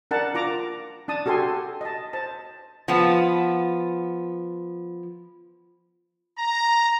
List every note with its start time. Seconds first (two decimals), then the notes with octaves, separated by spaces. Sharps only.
0.11 D4 A#4 F#5 A5
0.35 F4 A#5 D6
1.08 D4 A5 D#6
1.26 F#4 G4 A4 G#5 C6
1.81 D#5 A5
2.13 C5 A5
2.88 F3 B3
6.38 A#5